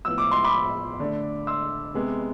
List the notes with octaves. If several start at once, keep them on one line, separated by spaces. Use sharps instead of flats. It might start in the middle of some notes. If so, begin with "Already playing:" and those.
A2 F3 B3 E4 E6
D6
C6
B5 D6
D3 A3 D4
C6 E6
C3 G#3 B3